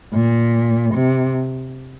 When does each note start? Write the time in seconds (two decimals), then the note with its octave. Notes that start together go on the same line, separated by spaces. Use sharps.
0.14 A#2
0.94 C3